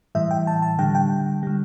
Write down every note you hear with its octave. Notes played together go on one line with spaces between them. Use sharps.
A2 E3 G3 E5
G5
A5
A5
D3 G3 G5
G5
D3 G3